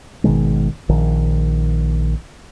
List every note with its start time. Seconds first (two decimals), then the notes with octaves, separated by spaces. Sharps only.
0.24 G#1 B2 D#3 G#3
0.89 A#1 D#3